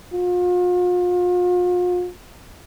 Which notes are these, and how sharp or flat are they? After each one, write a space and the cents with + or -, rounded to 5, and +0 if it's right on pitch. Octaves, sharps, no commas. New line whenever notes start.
F4 +40